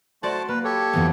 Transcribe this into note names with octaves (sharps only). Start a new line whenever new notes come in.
A3 F#4 C5 D5 A5
A#3 B4
G4 A4 C#5
F2 E3 B3